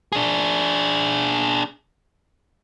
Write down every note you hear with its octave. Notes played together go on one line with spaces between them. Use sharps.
D4 G#4